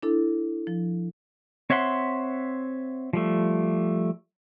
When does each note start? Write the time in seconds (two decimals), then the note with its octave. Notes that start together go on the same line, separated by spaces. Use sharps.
0.03 D4 E4 A4
0.67 F3
1.70 C4 C#5 E5 F#5 C6
3.13 F3 G3 A3